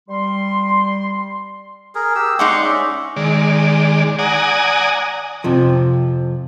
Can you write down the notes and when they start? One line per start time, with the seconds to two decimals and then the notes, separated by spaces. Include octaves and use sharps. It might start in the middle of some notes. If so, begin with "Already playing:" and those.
0.08 G3 C6
1.95 G#4 A#4
2.15 G4 E6
2.39 G#3 D#4 D5 F#5 C6 C#6
2.64 C#4 E5
3.16 D#3 G#3 D5
4.19 D5 F#5 G#5 A#5 D#6
5.44 F2 C3 F3